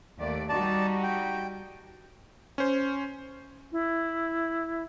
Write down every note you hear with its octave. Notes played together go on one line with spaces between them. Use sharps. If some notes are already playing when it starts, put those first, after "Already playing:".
D#2 A3 D5
G3 D#4 F#4 D5 A5
G5
C#4 C5
E4